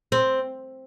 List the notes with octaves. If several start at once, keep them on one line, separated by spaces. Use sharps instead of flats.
C4